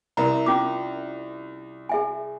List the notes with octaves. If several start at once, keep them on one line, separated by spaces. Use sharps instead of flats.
C2 A#4 E5 A#5
C#4 F4 D6
G#4 E5 G#5